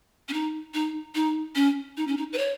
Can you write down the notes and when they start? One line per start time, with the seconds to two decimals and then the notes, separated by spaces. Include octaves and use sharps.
0.29 C#4
0.33 D#4
0.74 D#4
1.15 D#4
1.55 C#4
1.97 D#4
2.07 C#4
2.17 D#4
2.33 B4
2.38 C#5